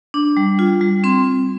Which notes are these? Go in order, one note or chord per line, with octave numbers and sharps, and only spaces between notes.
D4
G3
F4
G3
C4 C6